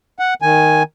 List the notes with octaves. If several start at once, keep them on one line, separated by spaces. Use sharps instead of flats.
F#5
D#3 G#5